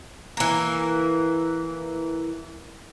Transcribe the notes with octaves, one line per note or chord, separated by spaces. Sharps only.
E3 A#3